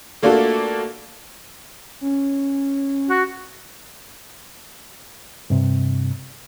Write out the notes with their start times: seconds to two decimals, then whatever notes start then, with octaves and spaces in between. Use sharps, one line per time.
0.22 A3 A#3 D4 F4 F#4 A4
2.01 C#4
3.10 F#4
5.50 G2 C3